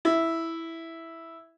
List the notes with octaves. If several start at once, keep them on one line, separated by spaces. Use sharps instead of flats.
E4